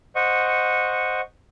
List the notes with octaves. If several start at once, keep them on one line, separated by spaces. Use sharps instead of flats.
C5 D#5 F#5 C#6